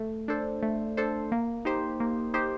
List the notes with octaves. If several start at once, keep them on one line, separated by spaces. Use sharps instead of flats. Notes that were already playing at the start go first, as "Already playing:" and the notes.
Already playing: A3
D4 A4 C5
A3
D4 A4 C5
A#3
D#4 G4 C5
A#3
D#4 G4 C5